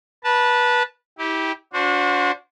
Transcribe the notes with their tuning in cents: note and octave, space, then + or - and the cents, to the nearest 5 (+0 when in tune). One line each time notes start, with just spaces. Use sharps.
B4 -20 A5 +0
E4 -35 G4 +0
D4 -30 F#4 -35 C5 +0